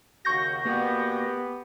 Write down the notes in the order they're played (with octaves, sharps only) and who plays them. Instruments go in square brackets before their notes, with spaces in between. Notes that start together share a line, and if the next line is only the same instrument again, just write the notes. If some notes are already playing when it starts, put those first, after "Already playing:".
[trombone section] D#2 C#3 F#4 [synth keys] C#6 G6 A#6
[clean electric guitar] A#3 F#4 [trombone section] B3 G4